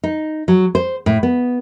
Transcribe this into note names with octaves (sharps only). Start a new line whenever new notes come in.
D#4
F#3
C5
A2
B3